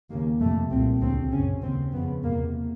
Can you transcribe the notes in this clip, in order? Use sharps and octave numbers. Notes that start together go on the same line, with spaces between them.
D#2 C#3 A#3
F2 C3 A3
C2 A#2 C4
D2 C#3 C4
F#2 C#3 C#4
D#2 C#3 C4
F2 C#3 B3
E2 C3 A#3